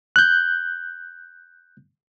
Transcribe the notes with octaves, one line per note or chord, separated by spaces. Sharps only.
F#6 G6